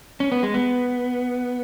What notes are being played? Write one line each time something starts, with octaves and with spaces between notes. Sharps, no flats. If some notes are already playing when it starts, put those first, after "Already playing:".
C#4
B3
G#3
B3